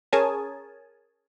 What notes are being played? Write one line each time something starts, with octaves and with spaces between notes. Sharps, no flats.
C#4 G#4 A#4 C#5 G#5 A5